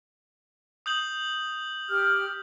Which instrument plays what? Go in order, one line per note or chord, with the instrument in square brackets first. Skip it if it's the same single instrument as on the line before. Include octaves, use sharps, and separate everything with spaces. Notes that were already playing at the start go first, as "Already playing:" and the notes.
[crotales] D#6 G6 F#7
[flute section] G4 F6